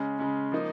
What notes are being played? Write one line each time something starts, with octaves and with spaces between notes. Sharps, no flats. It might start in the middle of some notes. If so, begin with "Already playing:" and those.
Already playing: C#3 G#3 C#4
C#3 G#3 C#4
F3 A#3 D#4